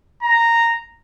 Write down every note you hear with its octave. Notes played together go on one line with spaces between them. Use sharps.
A#5